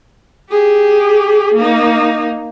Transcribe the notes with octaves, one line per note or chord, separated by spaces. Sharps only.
G4 G#4
A#3 D#4